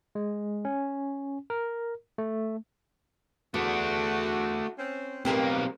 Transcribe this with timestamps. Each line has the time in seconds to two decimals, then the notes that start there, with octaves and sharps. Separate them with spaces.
0.15 G#3
0.65 C#4
1.50 A#4
2.18 A3
3.54 E2 A3 D4 F#4
4.78 C4 C#4
5.25 B1 G3 A#3 C4 D#4 G4 A#4 B4